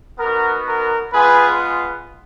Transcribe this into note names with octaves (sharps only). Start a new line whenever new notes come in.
B3 D#4 F#4 A#4
A#4
G#3 B3 F4 G#4 B4